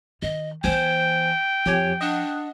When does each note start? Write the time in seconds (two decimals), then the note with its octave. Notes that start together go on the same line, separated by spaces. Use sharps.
0.22 D#3 D#5
0.64 E3 B3 C5 G5 G#5
1.66 F2 F3 G4 C#5 G#5
2.01 D4 D#5 F#5